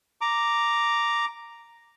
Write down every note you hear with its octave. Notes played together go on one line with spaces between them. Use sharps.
A#5 D6